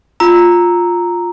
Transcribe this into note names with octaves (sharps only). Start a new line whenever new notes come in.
F4 A#5 E6